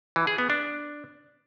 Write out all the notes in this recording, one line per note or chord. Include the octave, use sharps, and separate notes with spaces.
E3
G#4
B3
D4